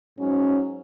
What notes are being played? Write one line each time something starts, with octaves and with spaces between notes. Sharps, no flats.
G#2 F#3 C#4